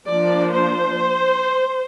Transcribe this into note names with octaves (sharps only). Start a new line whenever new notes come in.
F3 A#3 D4 D5
C5